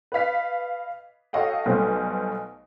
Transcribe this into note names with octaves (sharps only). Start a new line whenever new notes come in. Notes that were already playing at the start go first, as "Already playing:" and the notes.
B4 D#5 F5 B6
F#4 A4 C#5 D#5 F5 G5
B1 B2 G3 A3 C5